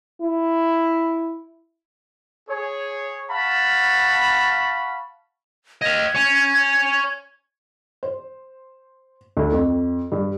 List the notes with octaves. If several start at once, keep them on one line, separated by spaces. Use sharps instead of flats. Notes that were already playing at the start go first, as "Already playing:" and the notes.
E4
G#4 C#5
F5 F#5 A5 B5 C#6
D#5 F5 G#6
C#5 G#5
C5
D2
F2
G2